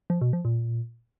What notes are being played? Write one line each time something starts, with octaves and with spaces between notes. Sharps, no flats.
F3
B2
F3
A#2